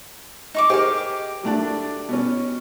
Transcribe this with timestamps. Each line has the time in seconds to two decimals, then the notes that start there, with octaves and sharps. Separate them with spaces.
0.54 D#4 C#6 D6
0.70 G4 G#4 A#4 C5 D#5
1.43 F#3 A3 D4
2.09 B2 C#4